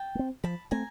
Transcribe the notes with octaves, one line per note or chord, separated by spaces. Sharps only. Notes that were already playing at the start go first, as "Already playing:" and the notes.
Already playing: G5 A5
A3
C4
F3 A5 B5
A3 C4 G#5 A#5